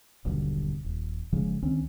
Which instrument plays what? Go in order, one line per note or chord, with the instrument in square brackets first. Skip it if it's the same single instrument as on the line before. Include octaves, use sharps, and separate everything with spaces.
[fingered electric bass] D#1 B1 G2 D3
D#1
F#1 C#3 F3 G#3
C#2 D#3 C4 C#4